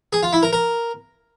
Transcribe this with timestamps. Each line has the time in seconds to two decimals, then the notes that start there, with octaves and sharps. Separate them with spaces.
0.13 G#4
0.23 F4
0.33 E4
0.43 A#4
0.53 A#4